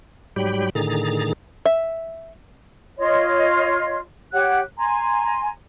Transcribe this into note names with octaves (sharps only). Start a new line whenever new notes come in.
G#2 F#3 G3 G4 G5 B5
A2 D3 D#3 G#4 A#5 A6
E5
F4 C#5 D#5 C6
G4 C#5 F#5 F#6
G#5 A#5 C6